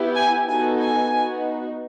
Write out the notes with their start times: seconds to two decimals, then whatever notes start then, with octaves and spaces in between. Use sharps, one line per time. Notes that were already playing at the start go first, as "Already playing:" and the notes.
Already playing: B3 E4 G4
0.15 G#5
0.48 B3 D#4 F#4 A4 G#5
0.80 G#5
1.14 B3 D#4 F#4